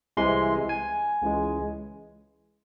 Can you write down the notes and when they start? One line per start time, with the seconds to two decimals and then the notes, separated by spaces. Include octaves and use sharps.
0.17 C2 C3 E3 G#3 C6
0.69 G#5
1.22 C#2 C#3 E3 G#3